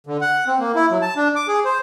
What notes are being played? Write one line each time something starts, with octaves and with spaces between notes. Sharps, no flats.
D3
F#5
C4
A#3
E4
F#3
A5
D4
D6
G#4
C5